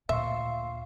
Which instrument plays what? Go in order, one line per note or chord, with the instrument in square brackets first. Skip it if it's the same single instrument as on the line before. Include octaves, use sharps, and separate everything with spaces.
[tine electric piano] D2 C6 C#6 [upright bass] A#2 [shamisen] E5 [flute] F5